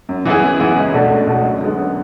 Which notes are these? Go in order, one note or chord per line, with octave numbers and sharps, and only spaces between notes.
F#2
E3 B3 E4 G#4
F#2
E3 B3 E4 G#4
C#2
B2 A3 D4 F#4
C#2
B2 A3 D4 F#4
F#2
D3 G#3 B3
F#2